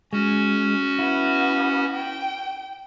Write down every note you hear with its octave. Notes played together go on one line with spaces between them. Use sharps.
G#3 C#4 F#4
B3 E4
G5